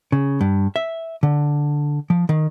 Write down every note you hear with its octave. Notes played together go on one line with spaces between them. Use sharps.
C#3
G2
E5
D3
F3
D#3